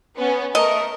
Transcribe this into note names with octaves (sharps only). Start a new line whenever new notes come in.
B3 C#4
A3 A#4 D#5